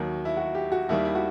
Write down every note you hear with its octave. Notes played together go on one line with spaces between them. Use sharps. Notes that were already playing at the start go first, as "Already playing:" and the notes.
Already playing: D#2 D#3 F#3
E4
F#4
G4
F#4
D#2 D#3 G3 E4
E4
F#4